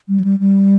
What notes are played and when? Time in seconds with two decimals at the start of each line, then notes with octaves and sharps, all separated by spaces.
0.08 G3
0.20 F#3
0.24 G3
0.40 G3